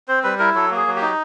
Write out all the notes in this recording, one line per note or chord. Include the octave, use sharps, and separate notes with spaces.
C4 C5
G3 B4
E4 A#4
F#3 A4
A#3
G#4
F#3
G4
D#4